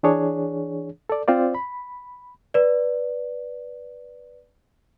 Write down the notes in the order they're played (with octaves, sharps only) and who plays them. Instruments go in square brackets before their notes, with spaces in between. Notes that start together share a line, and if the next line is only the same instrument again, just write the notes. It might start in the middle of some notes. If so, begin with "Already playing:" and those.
[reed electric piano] E3 D4 G#4 C#5
A4 D5
C4 F4 C5 D5
B5
[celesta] B4 D5